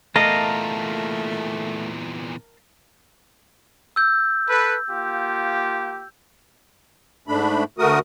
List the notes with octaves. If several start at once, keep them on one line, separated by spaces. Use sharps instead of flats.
E2 A#2 A3 A#4 D#5 F5 A5
E6 G6
A4 B4
A#3 F4 G4
G#2 A3 D4 B5
D2 A3 F#4 A#4 D#6